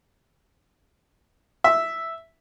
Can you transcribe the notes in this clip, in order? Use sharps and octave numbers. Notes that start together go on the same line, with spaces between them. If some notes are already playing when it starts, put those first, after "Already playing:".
E5